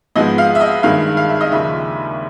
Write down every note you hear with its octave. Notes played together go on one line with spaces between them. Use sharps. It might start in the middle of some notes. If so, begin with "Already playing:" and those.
G#2 F3 G#3 B3 D#5
F5
E5
D#5
G2 D#3 G#3 F5
F5
E5
D#5
D#2 C#3 F3 E5